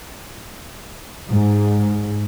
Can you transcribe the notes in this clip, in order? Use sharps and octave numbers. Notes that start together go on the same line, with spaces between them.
G#2